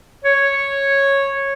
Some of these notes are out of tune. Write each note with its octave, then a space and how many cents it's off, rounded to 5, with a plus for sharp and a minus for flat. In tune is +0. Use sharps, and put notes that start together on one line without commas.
C#5 -5